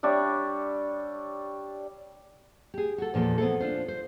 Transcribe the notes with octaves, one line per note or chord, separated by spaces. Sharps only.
G3 D4 C#5 E5
G4 G#4
F#4 A4
E2 A#2 F3 A4
B3 C4 E4 A4
D4 F4 C5
C5